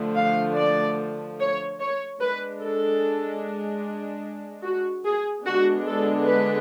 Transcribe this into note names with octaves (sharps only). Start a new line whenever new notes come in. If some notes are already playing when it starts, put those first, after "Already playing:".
Already playing: D3 F3 A3
F5
D5
C#5
C#5
G#3 D4 B4
A4
F#4
G#4
D3 G#3 B3 D4 F#4
A4
B4